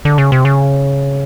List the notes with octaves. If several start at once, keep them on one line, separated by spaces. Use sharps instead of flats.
D3
C#3
C3
C#3